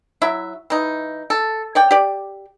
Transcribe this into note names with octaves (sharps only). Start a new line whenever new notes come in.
F#3 E4 E5
E3 D#4
A4
C#5 D5 G5
G4 D5